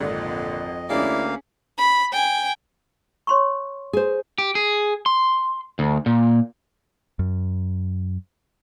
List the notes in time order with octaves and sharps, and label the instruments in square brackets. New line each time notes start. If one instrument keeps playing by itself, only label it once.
[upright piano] G#1 [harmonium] F2 D#5 [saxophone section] A#2 D3
[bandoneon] D2 A#3 F5 [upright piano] C#4 G#4 [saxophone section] E4 D5
[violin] B5
G5 G#5
[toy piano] C#5 C6 C#6
[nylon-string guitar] G#4 C5
[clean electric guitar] G4
G#4
C6
D2
A#2
[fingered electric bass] F#2